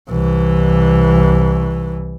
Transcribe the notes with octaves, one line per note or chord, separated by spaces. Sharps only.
C2 E3